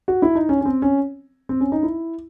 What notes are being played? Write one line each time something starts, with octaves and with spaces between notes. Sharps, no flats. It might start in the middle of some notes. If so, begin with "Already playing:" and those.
F#4
E4
D#4
C#4
C#4
C4
C#4
C4
C#4
D#4
E4